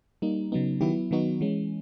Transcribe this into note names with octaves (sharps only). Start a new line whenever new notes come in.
G3 A#3 D#4
C#3 F#3 B3 D#4
D#3 F#3 B3 E4 G4
D#3 F#3 B3 D#4 F#4
E3 G#3 C#4